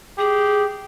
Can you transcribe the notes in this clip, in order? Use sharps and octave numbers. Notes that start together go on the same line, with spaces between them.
G4 G#4